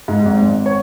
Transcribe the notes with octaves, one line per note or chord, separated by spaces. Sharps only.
G#2
G#1
G#1
C#5